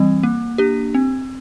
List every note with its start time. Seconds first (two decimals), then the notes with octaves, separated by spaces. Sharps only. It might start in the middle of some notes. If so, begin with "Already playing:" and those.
Already playing: E3 G3 C4
0.23 A#3
0.58 D4 G4
0.94 C4